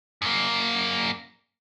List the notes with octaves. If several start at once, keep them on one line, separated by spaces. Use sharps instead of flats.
F#2 A#3